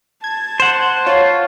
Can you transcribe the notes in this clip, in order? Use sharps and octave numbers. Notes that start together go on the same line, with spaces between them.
A5 G#6
C5 F#5
F4 C#5